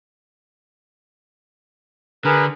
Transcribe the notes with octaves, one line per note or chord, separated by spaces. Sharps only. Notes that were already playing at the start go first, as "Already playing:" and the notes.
D3 G#4 A#4 B4